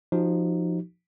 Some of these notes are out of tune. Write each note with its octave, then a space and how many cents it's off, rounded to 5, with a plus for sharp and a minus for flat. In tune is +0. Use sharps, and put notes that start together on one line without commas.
F3 +0 D#4 -10 F#4 +40